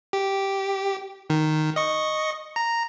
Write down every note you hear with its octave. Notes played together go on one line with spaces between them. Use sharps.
G4
D#3
D#5 C#6
A#5